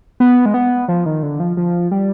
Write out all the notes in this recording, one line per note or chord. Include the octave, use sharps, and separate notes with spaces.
B3
G#3
B3
F3
D#3
D3
F3
F3
G3